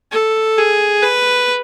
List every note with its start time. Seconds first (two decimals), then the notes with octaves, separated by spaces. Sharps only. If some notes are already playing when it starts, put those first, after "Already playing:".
0.12 A4
0.58 G#4
1.03 B4